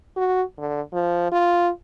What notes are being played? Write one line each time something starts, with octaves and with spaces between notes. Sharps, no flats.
F#4
D3
F3
F4